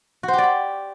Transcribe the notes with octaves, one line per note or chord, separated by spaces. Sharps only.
F#4
C5
G4
D5
B5